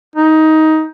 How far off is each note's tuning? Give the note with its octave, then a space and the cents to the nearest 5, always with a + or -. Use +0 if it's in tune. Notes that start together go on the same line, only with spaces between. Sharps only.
D#4 +15